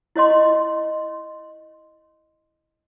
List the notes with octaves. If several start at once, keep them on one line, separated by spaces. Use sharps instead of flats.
E4 C#5 D#5 C6